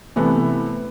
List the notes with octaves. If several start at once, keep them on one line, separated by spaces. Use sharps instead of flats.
C3 E3 A3 B3